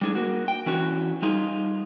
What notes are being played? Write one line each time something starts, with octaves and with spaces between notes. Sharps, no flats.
G3 D4 G#4
A#3 F#4
G5
E3 C#4 F#4
G3 D#4 F4 G#4